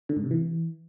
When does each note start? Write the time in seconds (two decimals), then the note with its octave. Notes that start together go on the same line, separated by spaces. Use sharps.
0.09 D3
0.17 G#2
0.24 C3
0.31 E3